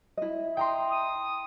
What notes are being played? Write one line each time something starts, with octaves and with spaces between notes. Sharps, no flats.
E4 D#5
G5 A#5 C6 D#6
D#6